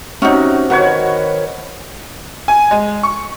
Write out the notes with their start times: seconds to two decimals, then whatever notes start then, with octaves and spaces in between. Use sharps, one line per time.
0.22 C3 C#4 D#4 F#4
0.70 D#3 F#4 B4 C#5
2.48 G#5
2.71 G#3
3.03 C#6